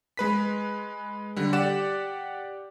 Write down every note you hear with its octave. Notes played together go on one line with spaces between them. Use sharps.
G#3 B4 B6
D3 G3
G4 D5 F#5 E7